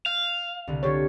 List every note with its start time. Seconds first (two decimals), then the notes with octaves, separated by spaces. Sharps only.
0.06 F5 G6
0.67 C2 D3
0.83 D3 F4 G4 A4 C#5